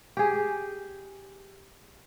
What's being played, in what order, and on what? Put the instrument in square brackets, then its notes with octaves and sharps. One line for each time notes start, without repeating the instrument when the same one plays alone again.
[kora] G4 G#4